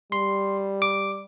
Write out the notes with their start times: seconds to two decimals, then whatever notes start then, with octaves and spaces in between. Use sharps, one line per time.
0.12 G3 C6
0.82 D6